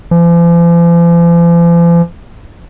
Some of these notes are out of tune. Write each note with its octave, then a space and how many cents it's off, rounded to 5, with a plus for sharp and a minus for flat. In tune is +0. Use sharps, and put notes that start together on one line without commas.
F3 -45